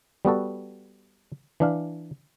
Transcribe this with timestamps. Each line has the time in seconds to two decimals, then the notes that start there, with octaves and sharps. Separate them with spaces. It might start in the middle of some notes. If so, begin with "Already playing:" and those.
0.25 G3 B3 F#4 A4
1.60 E3 D4 F5